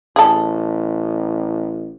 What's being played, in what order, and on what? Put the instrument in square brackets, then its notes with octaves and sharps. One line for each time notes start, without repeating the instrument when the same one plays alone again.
[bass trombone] A1 [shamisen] G#4 A4